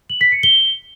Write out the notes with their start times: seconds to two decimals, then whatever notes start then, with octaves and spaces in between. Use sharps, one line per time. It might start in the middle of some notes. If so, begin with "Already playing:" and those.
0.10 F#7
0.21 B6
0.32 C#7
0.43 G7